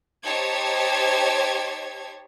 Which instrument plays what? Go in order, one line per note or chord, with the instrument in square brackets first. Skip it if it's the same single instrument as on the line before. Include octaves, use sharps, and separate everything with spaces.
[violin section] D#4 G4 C5 C#5 A5 G#6